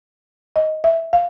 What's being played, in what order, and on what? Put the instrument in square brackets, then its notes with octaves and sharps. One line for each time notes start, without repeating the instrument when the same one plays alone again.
[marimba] D#5
E5
F5